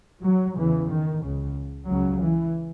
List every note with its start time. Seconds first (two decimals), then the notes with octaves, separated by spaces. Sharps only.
0.24 F#3
0.57 E2 C#3 E3
0.90 D#3
1.23 C#2 C#3
1.88 C#2 C#3 F#3
2.21 E3